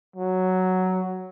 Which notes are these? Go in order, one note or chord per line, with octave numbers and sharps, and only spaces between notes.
F#3